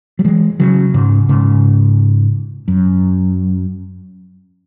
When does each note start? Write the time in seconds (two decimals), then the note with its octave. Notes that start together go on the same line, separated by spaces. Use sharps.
0.19 F#3
0.25 E3 G#3
0.60 C#3 F#3
0.94 G#2 C#3
1.29 G#2 C#3
2.68 F#2